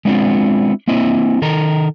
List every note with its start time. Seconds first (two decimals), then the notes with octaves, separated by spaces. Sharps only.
0.05 G#3 B3 C4 D4 E4 F4
0.88 A#3 C4 E4 D#5 E5
1.42 D#3 A4 A#4 D#5 A#5